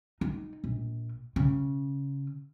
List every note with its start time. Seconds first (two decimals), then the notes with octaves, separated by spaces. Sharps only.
0.21 D#4
0.64 A#1
1.36 C#3